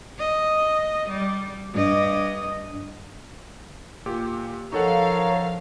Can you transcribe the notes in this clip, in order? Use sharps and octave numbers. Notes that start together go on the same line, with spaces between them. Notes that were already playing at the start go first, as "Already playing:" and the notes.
D#5
G3
G2 D#5
A#2 G4
F3 D#4 A4 A#4 C#5 F5 F#5